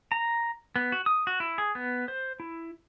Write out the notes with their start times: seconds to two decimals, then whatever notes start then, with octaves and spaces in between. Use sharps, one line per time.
0.12 A#5
0.76 B3
0.92 F#4
1.06 D#6
1.27 F#4
1.40 E4
1.58 G#4
1.75 B3
2.08 C5
2.40 E4